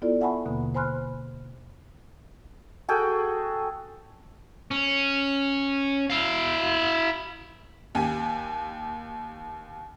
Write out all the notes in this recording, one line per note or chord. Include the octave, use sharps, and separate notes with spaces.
B3 E4 F4 A4 D5
E5 F#5 G#5 A5 B5 C#6
D#2 B2 D3 A#3
C5 G#5 B5 C6 F6 F#6
F#4 G#4 A4 G5
C#4
E4 F5
D#2 G4 G#5